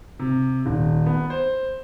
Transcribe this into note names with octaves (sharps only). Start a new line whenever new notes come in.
C3
D#1
B3
C5